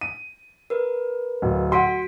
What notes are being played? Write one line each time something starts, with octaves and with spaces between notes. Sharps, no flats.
D#7
A#4 B4
D1
F#4 F#5 C6 B6 D7